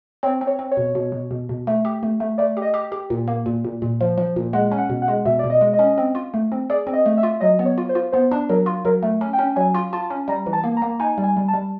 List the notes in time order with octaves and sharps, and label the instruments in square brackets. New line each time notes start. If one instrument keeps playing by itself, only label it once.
[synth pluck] C4 [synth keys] C#5
[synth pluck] C4
[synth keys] C#5
[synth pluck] C4
[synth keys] C#5
[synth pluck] B2
B2
B2
B2
B2
A3
G4
A3
A3
[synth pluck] A3 [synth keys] D5
[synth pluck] G4
[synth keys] D#5
[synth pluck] G4
G4
A#2
A#3
A#2
A#2
A#2
F3
F3
A#2
[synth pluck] G#3 [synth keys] F#5
[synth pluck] C#4
[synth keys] F#5
[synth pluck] B2
[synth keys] F#5
[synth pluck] G#3
[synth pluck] B2 [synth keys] E5
[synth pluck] B2 [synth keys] D5
[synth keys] D#5
[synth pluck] G#3
[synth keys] D#5
[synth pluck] C#4
C4
F4
A3
C4
[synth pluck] G#4 [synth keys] D5
[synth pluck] C4
[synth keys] D#5
[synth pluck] A3
[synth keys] E5
[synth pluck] F4
[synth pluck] F#3 [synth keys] D#5
[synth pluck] B3
[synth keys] C#5
[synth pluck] F4
[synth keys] C5
[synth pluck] F4
[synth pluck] B3 [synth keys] C5
[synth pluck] D4
[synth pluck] F#3 [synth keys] A#4
[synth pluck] F4
[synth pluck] F#3 [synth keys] A#4
[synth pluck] A3
C#4
[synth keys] G5
[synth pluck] C#4
[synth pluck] F#3 [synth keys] G#5
[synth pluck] F4
[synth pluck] F4 [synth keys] A5
[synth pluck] C#4
[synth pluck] G3 [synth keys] A#5
[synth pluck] E3
[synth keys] A5
[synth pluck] A#3
[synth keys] A#5
[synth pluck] A#3
[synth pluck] D#4 [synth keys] G#5
[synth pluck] G3
[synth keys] G#5
[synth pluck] G3
[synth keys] A5
[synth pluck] G3